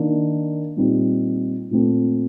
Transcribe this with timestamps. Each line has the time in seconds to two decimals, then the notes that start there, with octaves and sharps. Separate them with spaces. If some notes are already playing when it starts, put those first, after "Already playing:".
Already playing: D#3 A#3 D4
0.76 A#2 G3 C4 D#4
1.71 A#2 A3 C4